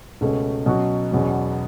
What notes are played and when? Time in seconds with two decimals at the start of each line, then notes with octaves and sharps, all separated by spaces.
0.21 C#2 B2 A3 C#4
0.66 B2 F#3 C#4 F#4
1.11 E2 B2 F#3 C#4